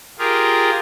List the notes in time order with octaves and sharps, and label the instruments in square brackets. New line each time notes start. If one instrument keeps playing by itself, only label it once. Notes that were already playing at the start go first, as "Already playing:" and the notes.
[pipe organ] F4 G4 G#4 A#4